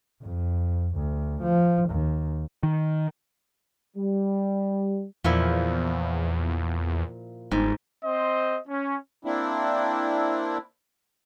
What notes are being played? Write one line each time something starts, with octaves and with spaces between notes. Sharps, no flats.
F2
D2
F3
D#2
D#3
G3
E2 A#2 F3 E4
G1 G#2
C4 C5 D#5
C#4
A#3 C4 D4 E4